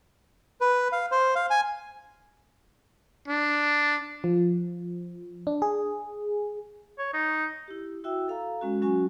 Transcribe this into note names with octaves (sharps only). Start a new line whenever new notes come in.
B4
F5
C5
F5
G#5
D4
F3
D4
G#4
C#5
D#4
E4 G4
E4 F#4 E5 G5 E6
A4 F5 A#5
G#3 C#4 F#4
F#3 C#4 F#4 G#5 C#6